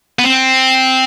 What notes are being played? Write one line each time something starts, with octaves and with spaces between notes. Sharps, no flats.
B3
C4